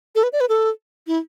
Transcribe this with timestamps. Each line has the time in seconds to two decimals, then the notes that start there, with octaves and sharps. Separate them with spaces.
0.15 A4
0.23 B4
0.33 D5
0.41 B4
0.49 A4
1.07 E4